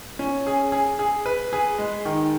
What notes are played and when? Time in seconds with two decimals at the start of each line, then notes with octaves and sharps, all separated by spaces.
0.19 C#4
0.47 G#4
0.72 G#4
0.99 G#4
1.26 B4
1.53 G#4
1.78 G#3
2.05 D#3